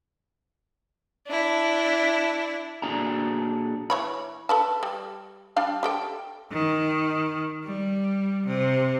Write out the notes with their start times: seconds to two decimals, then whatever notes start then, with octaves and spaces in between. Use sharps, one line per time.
1.27 D4 E4
2.82 A#2 D4 F#4 G#4 A4 A#5
3.90 E3 C#5 B5
4.49 A4 B4 A5
4.83 G3
5.56 G3 D4 F5
5.83 G4 A4 G5
6.51 D#3
7.65 G3
8.47 C3